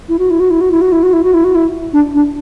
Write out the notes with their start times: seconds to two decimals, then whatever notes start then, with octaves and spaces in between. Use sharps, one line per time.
0.09 E4
0.19 F#4
0.30 E4
0.40 F#4
0.50 E4
0.61 F#4
0.71 E4
0.81 F#4
0.92 E4
1.03 F#4
1.13 E4
1.24 F#4
1.34 E4
1.44 F#4
1.55 E4
1.93 D4
2.14 D4